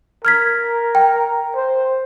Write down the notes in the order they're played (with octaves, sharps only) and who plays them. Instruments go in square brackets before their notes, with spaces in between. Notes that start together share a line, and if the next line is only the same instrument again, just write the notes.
[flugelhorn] A#4 [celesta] F6 G#6 B6
[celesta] G5
[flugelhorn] C5